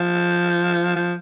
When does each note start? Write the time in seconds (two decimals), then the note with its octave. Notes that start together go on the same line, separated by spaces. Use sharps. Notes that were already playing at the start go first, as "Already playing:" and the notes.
Already playing: F3
0.96 F3